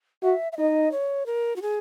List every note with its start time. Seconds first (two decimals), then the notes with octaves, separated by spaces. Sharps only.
0.23 F#4 E5
0.52 E5
0.57 D#4 D#5
0.91 C#5
1.26 A#4
1.56 F#4
1.62 G#4